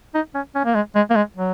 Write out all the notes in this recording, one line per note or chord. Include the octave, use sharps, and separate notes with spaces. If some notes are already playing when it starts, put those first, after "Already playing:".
D#4
C#4
C#4
A#3
G#3
G#3
A#3
G#3
F#3